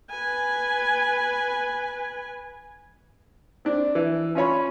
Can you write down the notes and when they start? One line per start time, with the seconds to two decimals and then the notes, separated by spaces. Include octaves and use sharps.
0.10 B4 G#5
3.65 C4 D4
3.95 E3
4.35 C#4 F4 C#5 B5